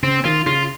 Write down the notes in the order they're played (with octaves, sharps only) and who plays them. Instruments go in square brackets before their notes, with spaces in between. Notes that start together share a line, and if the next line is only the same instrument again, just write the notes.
[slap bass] C#3 [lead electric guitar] C4
[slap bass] D#3 [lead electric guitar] F4
[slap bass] C#3 [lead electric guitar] F4